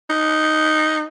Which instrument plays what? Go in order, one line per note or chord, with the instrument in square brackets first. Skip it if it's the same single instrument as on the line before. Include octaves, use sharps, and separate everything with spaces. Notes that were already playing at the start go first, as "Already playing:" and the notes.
[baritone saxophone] D#4